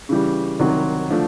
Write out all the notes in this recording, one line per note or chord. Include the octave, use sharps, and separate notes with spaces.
C#3 E3 G3
C2 C3 D#3 F#3
D3 F3 A3 D4